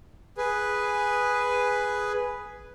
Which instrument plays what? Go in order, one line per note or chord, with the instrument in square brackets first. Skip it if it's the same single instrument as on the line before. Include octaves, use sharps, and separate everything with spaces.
[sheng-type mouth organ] G#4 B4